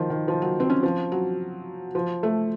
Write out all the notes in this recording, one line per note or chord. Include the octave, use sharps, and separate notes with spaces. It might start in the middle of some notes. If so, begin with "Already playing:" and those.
Already playing: D#3 F3
D#3
F3
F#3
C4
C#4
F3
F#3
F3
A3